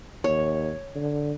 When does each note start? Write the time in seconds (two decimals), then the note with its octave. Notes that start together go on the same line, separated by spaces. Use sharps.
0.24 D#2 C#5
0.95 D3